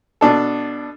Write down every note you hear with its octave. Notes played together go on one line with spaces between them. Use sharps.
B2 D4 A4